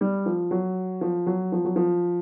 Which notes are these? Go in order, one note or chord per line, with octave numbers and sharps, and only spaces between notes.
G3
F3
F#3
F3
F#3
F3
F#3
F3